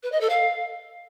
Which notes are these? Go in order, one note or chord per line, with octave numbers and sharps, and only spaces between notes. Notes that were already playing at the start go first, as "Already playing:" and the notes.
B4
D#5
A4
F5